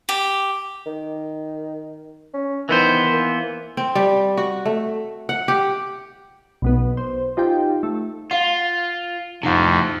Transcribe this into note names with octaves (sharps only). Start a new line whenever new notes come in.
G4
D#3
C#4
D#3 E3 B3 C5
A#3
C4
G3
F#4
A3
F#5
G4
B1 B2 B3
C5
D#4 F4 G4 G5
A3
F4 F5 F#5
F2 A2 C3 D#4 F#5